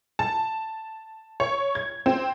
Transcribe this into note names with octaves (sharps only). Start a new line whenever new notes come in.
A5
C#5
G#6
C4